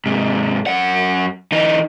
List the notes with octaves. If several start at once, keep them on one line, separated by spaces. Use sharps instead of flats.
G#2 C3
F#2 F#5
E3 D#4